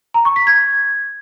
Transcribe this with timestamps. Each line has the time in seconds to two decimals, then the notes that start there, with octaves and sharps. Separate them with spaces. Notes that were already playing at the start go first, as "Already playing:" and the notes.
0.14 A#5
0.25 C#6
0.36 B6
0.47 G#6